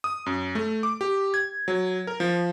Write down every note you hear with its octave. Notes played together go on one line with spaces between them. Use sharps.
D#6
F#2
A3
D6
G4
G#6
F#3
A#4
F3